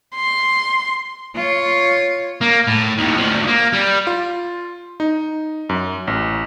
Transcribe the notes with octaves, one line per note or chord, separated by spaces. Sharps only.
C6
F4 C#5
A#3
A2
D#2 A2
D2 F3
A#3
G3
F4
D#4
F#2
A1